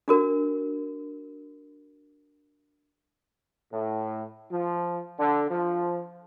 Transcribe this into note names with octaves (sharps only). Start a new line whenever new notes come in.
D4 F#4 A#4
A2
F3
D3
F3